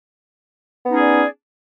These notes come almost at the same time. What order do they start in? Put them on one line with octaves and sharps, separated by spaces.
B3 D#4 C#4 G#4 D5